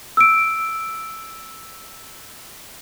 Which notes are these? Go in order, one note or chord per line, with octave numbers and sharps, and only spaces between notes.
E6 D7